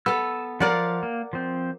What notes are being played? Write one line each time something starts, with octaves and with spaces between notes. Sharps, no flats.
B3 A4 E6
F3 A#4 D5 F5 F#5
A#3
F3 C4